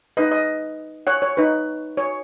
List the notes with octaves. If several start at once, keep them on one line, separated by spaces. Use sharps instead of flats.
D#4 B4 D#5
D#5
C#5 F#5
C#5
D#4 B4
C#5